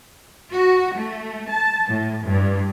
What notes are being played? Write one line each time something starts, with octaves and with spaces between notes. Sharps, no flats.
F#4
A3
A5
A2
G2